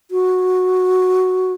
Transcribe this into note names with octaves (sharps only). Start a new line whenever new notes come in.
F#4